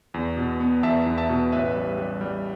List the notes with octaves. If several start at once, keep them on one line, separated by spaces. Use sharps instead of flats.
E2
B2
B3
E2 E5 A5
E2
E5 A5
B2
A1 B4 E5
G3
G3
G3